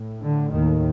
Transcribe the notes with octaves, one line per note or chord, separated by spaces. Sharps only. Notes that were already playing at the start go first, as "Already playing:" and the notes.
Already playing: A2
D3
D#2 D#3